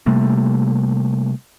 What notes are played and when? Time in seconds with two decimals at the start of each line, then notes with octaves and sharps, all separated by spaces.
0.06 C3 G3 A3 A#3